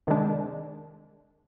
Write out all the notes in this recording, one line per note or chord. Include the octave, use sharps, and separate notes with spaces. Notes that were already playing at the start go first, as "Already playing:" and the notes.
C3 D#3 G#3 D4